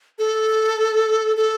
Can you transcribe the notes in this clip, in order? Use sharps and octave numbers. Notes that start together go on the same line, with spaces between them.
A4
A4